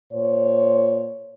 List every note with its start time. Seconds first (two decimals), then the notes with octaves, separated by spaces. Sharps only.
0.12 A#2 C5 C#5